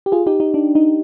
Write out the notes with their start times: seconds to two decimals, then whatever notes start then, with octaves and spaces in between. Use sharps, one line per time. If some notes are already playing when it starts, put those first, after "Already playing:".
0.06 G4
0.12 F4 G#4
0.27 D#4 G4
0.40 D#4
0.54 D4
0.75 D#4